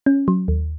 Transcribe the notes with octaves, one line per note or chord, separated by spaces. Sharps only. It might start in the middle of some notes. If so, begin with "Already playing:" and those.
C#4
F#3
D#2